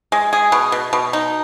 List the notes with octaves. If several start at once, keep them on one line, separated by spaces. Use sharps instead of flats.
G#3
G#4
B2
B2
B2
D#4